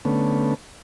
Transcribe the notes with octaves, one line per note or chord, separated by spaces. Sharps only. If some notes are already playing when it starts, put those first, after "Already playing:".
D3 A3 B3 C#4